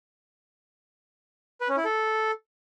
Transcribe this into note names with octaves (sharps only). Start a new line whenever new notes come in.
B4
C#4
E4
A4